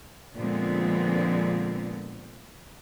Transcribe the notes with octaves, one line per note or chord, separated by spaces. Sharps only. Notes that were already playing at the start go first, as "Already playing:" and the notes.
A#2 D3 F3 G#3 B3 C4